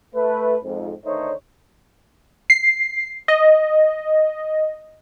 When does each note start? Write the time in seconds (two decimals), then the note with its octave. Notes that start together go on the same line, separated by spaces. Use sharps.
0.15 A3 B4
0.63 F2 G#2
1.05 D3 D#3 A3 D#4 C5 C#5
2.50 C7
3.28 D#5